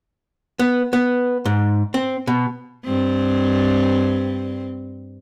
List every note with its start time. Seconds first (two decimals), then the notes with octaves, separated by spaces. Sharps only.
0.59 B3
0.93 B3
1.45 G#2
1.94 C4
2.27 B2
2.85 G2 C4